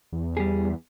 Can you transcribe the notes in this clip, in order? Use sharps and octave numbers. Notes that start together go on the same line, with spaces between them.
E2
G3 G#4